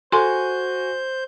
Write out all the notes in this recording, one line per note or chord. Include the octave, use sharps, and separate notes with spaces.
F#4 A4 C5 G#5 C6 G6